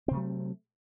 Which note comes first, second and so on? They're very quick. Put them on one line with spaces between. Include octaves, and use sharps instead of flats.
C4 C3 A3 F#3